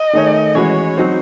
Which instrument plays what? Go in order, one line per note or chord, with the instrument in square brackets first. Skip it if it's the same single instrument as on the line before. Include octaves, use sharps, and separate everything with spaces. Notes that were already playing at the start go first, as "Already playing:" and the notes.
Already playing: [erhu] D#5
[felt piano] D#3 A3 D#4 G#4 C#5
[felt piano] E3 G#3 C#4 F#4 [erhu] C#5
[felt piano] F#3 C4 D#4 F#4 C5